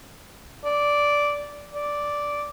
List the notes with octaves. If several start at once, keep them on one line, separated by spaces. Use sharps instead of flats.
D5
D5